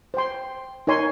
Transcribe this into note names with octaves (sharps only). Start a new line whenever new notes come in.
C5 G5 C6
D#4 A#4 C#5 G#5 C6